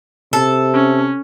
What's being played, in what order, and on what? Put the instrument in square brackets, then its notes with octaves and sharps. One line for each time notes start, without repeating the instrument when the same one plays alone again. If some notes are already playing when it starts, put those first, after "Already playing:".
[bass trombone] C3 [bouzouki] A4
[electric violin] C#4